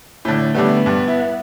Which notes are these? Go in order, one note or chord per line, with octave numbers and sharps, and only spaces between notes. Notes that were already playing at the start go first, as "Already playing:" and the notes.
A2 D3
D3 G3 A3 B3
G2
E4